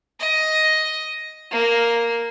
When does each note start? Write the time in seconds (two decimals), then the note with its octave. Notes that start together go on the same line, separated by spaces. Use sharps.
0.20 D#5
1.51 A#3